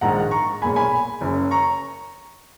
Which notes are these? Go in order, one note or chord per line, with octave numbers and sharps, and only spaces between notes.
A#1 G#2 D#3 F#5 A#5
A#5 C#6
B1 A#2 G#3 G#5 B5
G#5 B5
F#1 F#2 C#3
A#5 C#6